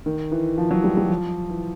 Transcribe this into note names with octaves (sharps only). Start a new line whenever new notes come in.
D#3
E3
F3
F#3
G3
G3
F3
E3